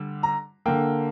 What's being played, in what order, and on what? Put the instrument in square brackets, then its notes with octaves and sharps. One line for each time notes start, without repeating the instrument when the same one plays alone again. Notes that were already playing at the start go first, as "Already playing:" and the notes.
Already playing: [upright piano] D3 G3
A#5
D3 A#3 G5